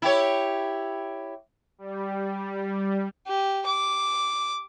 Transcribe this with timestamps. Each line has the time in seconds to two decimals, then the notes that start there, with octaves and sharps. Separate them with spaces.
0.02 E4 G4 C#5
1.78 G3
3.28 G4
3.66 D6